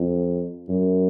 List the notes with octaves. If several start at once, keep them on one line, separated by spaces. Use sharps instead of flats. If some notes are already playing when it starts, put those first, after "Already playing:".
Already playing: F2
F#2